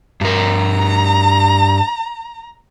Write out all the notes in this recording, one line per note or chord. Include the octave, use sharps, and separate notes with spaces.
G2 A#4 A#5